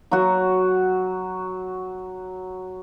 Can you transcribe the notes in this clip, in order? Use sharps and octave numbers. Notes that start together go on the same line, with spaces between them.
F#3 F#4